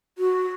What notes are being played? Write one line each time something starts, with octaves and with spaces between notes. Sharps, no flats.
F#4